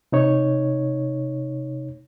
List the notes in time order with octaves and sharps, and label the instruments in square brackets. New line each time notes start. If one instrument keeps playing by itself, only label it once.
[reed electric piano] C3 D#4 C#5